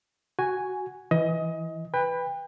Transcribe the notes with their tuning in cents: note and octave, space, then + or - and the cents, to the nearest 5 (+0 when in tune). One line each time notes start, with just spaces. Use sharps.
F#4 +5 G#5 +0
E3 +0 E4 +0 D#5 +25
B4 +0 G5 +35